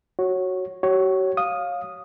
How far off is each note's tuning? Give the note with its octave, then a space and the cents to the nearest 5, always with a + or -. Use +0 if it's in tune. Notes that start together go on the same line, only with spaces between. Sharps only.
F#4 +5 C#5 -10
F#4 +45 C#5 +0
F5 +15 D#6 -5